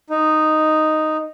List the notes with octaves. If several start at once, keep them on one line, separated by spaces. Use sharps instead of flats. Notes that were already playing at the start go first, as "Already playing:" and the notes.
D#4